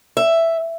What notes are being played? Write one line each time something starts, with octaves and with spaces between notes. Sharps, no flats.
E5